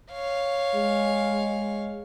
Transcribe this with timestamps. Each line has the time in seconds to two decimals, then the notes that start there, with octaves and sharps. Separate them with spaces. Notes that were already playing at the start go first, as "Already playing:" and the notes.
0.13 C#5 F5
0.76 G#3